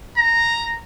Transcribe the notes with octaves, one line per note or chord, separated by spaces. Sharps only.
A#5